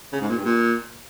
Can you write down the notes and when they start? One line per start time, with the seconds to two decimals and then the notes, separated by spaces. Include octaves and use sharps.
0.13 C#3
0.21 G#2
0.29 A#2
0.37 G2
0.45 A#2